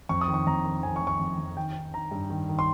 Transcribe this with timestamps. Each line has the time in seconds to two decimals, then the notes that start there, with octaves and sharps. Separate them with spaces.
0.09 F2 C#6
0.21 D#6
0.28 D#3
0.34 C#6
0.47 F2 A#5
0.65 D#3
0.83 F2 G#5
0.96 C#6
1.02 F2
1.07 C#6
1.20 F2
1.38 F2
1.56 D#3 G5
1.75 D#3
1.94 D#3 A#5
2.11 G2
2.30 D#3
2.49 D#3
2.59 C6